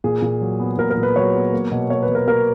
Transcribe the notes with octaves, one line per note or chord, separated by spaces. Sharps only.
A#2 G#4
A#2
F#3
B3
A#2 A#4
A#4
A#2
B4
F#3 C#5
B3
A#3
B2
A#3 C#5
B4
B2
A#4
A#3 A#4